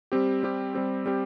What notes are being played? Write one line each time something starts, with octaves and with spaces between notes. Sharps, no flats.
G3 C4 G4
G3 C4 G4
G3 C4 G4
G3 C4 G4